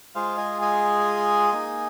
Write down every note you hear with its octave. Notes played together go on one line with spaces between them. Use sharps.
G#3 F4 G#4 C5 F5
D#5 G#5
D#5 G#5
A#3 D#4 G#4